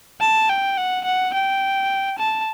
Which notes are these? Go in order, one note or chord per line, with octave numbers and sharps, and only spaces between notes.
A5
G5
F#5
F#5
G5
A5